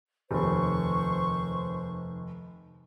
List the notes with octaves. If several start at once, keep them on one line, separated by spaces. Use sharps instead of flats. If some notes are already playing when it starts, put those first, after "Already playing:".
F1 D#2 C5 C#6